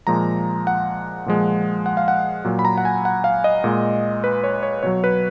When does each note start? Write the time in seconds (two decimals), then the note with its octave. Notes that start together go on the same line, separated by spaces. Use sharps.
0.07 A#2 F3 G#3 A#5
0.67 F#5
1.26 A#2 F3 G#3
1.86 F#5
1.97 F5
2.08 F#5
2.45 A#2 F#3
2.59 B5
2.65 A#5
2.78 F#5
2.85 G#5
3.05 F#5
3.24 F5
3.44 D#5
3.64 A#2 G#3
4.24 B4
4.44 C#5
4.63 C#5
4.83 B2 F#3 C#5
5.04 B4